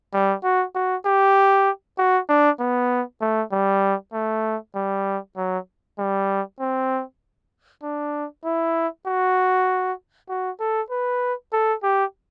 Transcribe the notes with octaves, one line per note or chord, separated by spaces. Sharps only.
G3
F#4
F#4
G4
F#4
D4
B3
A3
G3
A3
G3
F#3
G3
C4
D4
E4
F#4
F#4
A4
B4
A4
G4